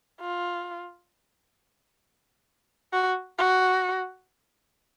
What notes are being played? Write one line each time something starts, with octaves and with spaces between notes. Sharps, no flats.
F4
F#4
F#4